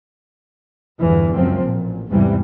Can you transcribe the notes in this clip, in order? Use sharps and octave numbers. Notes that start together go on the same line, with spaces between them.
G1 E2 E3
C#2 F#2 F3 C4
A1 A#2
E2 G#2 C3 E3 G3